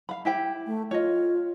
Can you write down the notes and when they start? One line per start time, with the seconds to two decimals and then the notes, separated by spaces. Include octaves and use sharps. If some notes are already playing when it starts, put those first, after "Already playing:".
0.09 F5 B5
0.25 E4 G4 G5
0.66 A3
0.91 F4 C#5 D#5